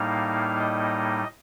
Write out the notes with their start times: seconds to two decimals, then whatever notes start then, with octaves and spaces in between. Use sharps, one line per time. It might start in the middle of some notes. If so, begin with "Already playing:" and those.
Already playing: A2 G3 A#3 D#4 F5
0.59 D#5